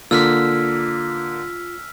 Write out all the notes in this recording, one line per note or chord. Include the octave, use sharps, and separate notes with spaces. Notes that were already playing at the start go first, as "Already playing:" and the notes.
D3 A#3 F4 E6 F6 B6